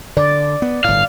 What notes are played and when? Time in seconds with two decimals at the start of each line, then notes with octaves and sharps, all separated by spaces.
0.17 D3 D5
0.62 B3
0.84 G1 A2 F5